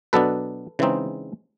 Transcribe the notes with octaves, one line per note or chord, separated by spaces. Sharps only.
B2 F#3 B3 D4 A4 B4
C#3 E3 G#3 C4 D#4